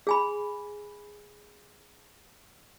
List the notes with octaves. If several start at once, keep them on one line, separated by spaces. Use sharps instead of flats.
G#4 G#5 B5